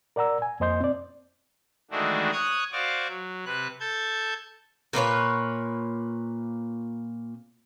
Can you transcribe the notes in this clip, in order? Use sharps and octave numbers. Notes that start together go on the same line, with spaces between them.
A#4 D5 F#5 A#5 E6
G#5
F2 A#3 C5 D#5 C6 G6
C4 D5
D#3 E3 G#3 A3 D4 F#4
C#5 D#6 F#6 G#6
F#4 C5 D5 F5 C#6 D6
F#3
C3 B4 F#6
A4 A5 G6 G#6
A#2 A#3 B4 C#5